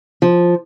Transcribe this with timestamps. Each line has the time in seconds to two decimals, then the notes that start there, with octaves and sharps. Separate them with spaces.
0.22 F3